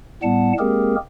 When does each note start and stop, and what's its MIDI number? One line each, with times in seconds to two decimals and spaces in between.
0.23 0.53 45
0.23 0.53 55
0.23 0.53 59
0.23 0.53 78
0.23 0.53 81
0.59 0.95 56
0.59 0.95 58
0.59 0.95 60
0.59 0.95 67
0.59 0.95 68
0.59 0.95 70